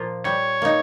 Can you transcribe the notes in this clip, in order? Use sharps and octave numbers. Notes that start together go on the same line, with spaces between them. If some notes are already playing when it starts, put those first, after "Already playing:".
Already playing: A#2 F3 A#3 F4
G3 C#5
A#3 D#4